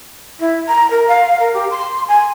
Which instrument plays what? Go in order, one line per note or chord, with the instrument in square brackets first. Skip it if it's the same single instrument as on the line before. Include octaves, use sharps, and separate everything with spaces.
[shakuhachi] E4
A#5
A#4
F5
A#4
G4
C6
G#5